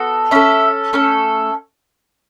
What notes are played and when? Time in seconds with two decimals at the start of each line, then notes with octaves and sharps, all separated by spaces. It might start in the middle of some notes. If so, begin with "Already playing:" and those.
Already playing: B3 F#4 A4
0.31 C#4 A4 E5
0.93 A3 C#4 A4